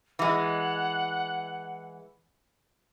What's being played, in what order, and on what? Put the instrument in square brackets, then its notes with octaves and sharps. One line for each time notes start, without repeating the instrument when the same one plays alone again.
[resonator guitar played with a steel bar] E3 G#3 [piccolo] F#5